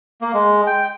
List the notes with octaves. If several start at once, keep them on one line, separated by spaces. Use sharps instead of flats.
A#3
G#3
G5